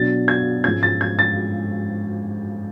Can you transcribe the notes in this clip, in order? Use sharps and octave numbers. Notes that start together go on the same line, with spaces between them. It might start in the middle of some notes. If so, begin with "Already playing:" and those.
Already playing: B2 F#3 B3 D4 A6
G#6
G#2 F3 G#3 C#4 G#6
A6
G#6
A6